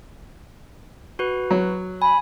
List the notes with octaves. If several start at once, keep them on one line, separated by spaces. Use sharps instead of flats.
F#4 B4
F#3
G#5 B5